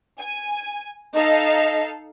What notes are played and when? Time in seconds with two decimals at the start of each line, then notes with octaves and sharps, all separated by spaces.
0.18 G#5
1.13 D#4 A4 D#5 F5